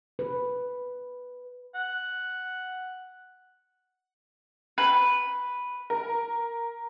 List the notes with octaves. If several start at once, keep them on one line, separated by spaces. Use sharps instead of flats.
B4
F#5
B4
A#4